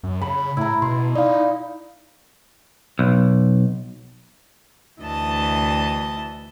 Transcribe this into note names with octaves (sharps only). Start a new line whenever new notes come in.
F#2
C#3 B5
A2 E4 A#5
B2 C6
D#4 D5 F5
B1
D2 E3 D#5 A5